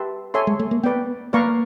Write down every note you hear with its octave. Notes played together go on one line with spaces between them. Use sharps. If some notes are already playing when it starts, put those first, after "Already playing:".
Already playing: G4 B4 E5 A5 C6
A4 C#5 E5 G#5 C6
G#3
A3
A#3
B3 B4 D5 G5
A#3 B4 D5 F5 A#5 C#6